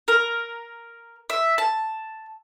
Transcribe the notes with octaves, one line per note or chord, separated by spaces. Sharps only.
A#4
E5
A5